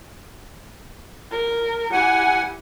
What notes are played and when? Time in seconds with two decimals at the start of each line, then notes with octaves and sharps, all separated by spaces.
1.31 A#4
1.92 E4 G4 F#5 G#5